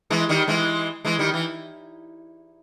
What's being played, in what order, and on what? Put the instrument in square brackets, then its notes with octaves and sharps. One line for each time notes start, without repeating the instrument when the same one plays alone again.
[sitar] E3 G#3
D#3 G3
E3 G#3
E3 G#3
D#3 G3
E3